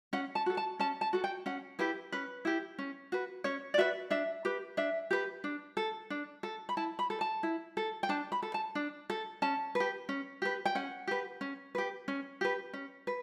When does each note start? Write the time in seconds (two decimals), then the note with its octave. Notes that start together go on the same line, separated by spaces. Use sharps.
0.13 C#4 F#5
0.35 A5
0.46 F#4 A4
0.57 A5
0.79 C#4 A5
1.01 A5
1.13 F#4 A4
1.24 G5
1.46 C#4 F#5
1.79 E4 G4 B4
2.12 C#4 B4
2.45 E4 G4
2.79 C#4
3.12 F#4 B4
3.44 C#4 C#5
3.74 D5
3.78 F#4 B4 E5
4.10 D4 E5
4.45 G4 B4
4.77 D4 E5
5.11 G4 B4
5.44 D4
5.77 A4
6.10 D4
6.43 A4
6.69 B5
6.77 E4 A5
6.99 B5
7.10 A4
7.21 A5
7.43 E4
7.77 A4
8.03 G5
8.09 D4 A5
8.32 B5
8.42 A4
8.54 A5
8.75 D4
9.10 A4
9.42 C#4 A5
9.75 B4
9.80 G4
10.09 C#4
10.42 G4 B4
10.66 G5
10.75 C#4 F#5
11.07 G4 B4
11.41 C#4
11.75 G4 B4
12.08 C#4
12.41 G4 B4
12.73 C#4
13.07 B4